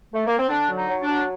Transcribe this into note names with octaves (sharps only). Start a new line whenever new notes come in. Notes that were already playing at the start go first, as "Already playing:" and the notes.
A3
A#3
C4
D3 D4
F#3
D#4
F#3
D4
F#3